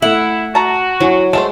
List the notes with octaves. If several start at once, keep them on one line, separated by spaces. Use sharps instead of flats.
A3 E4 A4 E5 F#5
F#4 A5 A#5
F#3 E4 G#5 C#6
G#3 A3 A4 C5 E7